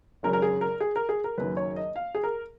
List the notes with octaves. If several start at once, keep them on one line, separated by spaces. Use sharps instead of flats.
G#1 F#2 C#3 A#4
A#4
G#4
A#4
G#4
A#4
G#4
A#4
F#1 F#2 D#3 B4
C#5
D#5
F5
G#4
A#4